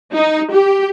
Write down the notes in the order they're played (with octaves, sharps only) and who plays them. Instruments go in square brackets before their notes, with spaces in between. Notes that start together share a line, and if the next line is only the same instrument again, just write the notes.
[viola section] D#4
G4